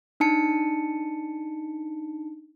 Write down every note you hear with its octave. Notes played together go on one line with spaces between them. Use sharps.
D4 D#4 A5 C#7